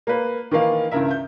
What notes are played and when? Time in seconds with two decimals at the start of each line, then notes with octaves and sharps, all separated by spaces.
0.07 A#3 B4
0.51 D#3 E3 A#3 F5
0.91 C#2 G2 C#3 E4 A#4 E5
1.11 G6